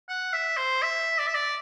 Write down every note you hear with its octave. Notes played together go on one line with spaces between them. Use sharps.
F#5
E5
C5
E5
D5
E5
D5